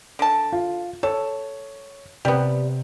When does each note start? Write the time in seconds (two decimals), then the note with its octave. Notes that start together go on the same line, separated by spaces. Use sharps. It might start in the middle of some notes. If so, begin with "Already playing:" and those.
0.19 D3 A5
0.52 F4
1.03 A4 C#5
2.25 C3 G3 B3